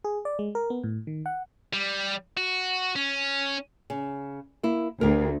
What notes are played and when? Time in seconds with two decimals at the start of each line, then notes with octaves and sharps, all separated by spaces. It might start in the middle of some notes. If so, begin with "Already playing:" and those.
0.04 G#4
0.25 D5
0.39 G#3
0.55 A#4
0.70 B3
0.84 A2
1.07 D#3
1.26 F#5
1.73 G3
2.37 F#4
2.96 C#4
3.90 C#3
4.63 A#3 E4
5.01 D2 G4 A#4